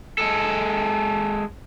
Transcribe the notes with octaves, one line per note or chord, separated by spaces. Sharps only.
G#3 A4